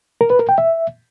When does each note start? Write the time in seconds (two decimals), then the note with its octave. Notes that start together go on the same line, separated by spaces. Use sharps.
0.21 A#4
0.30 B4
0.39 A#4
0.49 G5
0.58 E5